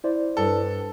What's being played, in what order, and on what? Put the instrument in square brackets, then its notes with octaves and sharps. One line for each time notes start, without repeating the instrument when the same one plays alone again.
[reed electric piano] E4 C5 D5
[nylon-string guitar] G2 [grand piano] A4